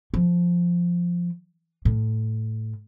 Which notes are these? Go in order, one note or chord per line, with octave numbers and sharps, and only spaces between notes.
F3
A2